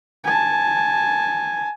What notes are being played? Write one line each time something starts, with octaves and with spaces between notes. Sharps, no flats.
G#5 A5